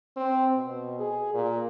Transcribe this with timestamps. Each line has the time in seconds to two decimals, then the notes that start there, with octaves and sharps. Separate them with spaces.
0.16 C4
0.56 B2
0.99 G#4
1.34 A#2